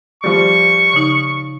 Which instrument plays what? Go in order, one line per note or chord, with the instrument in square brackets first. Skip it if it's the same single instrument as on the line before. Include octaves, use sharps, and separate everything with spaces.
[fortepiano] F3 G3 [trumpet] C#6
[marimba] C#3 D#4